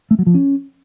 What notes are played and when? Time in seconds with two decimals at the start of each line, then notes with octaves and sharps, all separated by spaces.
0.11 A3
0.19 F#3
0.27 F3
0.34 C#4